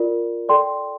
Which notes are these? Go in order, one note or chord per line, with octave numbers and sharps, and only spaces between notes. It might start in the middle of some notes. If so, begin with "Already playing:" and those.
Already playing: F4 A#4 D5
A4 D5 G5 C6